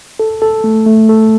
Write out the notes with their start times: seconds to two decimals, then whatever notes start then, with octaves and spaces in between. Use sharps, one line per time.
0.20 A4
0.42 A4
0.64 A3
0.86 A3
1.09 A4